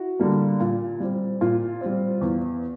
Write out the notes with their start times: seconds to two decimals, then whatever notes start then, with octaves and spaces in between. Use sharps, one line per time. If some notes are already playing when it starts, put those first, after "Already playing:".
Already playing: E4 F#4
0.20 D3 G3 A#3
0.60 A#2
1.00 G3 C4
1.41 A#2 F4
1.81 G3 C4
2.21 E2